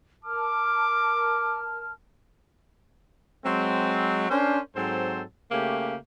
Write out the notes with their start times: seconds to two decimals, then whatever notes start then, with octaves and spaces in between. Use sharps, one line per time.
0.25 A#4 A5 D6 F6
3.45 F#3 G#3 C4
4.30 C#4 D4 A#4 C5
4.76 G#2 F#3 C4 A4 C5
5.51 C#3 A3 A#3 G4